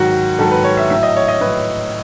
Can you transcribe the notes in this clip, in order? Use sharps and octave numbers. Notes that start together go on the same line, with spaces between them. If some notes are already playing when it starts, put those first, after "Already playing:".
Already playing: G#2 D#3 F#3 F#4
G#2 D#3 F#3 A4
B4
C#5
E5
A2 F#3 E5
D#5
C#5
D#5
A2 B4
F#3